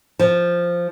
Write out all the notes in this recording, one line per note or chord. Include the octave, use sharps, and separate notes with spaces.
F3